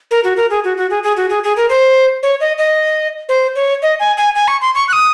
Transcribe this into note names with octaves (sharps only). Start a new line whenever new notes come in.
A#4
F#4
A#4
G#4
F#4
F#4
G#4
G#4
F#4
G#4
G#4
A#4
C5
C#5
D#5
D#5
C5
C#5
D#5
G#5
G#5
G#5
C#6
C6
C#6
F#6
D#6